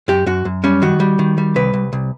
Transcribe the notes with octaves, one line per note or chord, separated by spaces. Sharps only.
F#2 G4
F#2 F#4
F#2
G3 C#4
D#3 F#4
G3
D#3
G3
C2 B4
C2
C2